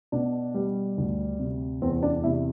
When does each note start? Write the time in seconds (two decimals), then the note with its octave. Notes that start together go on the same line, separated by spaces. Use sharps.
0.12 B2 D4
0.55 G3
0.98 D2
1.39 C3
1.82 E2 C4
2.03 D4
2.24 C3 E4